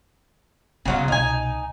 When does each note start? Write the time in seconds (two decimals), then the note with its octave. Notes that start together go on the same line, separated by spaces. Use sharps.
0.85 C#3 F#3 G3 B3 F4
1.08 C2 B2 D#4 G#5